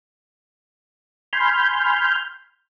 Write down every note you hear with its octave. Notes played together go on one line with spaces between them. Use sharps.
G#5 B5 C6 F6 G6